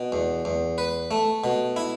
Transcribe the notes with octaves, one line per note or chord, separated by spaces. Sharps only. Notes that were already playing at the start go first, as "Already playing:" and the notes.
Already playing: B2
E2
E2
B4
A3
B2
E4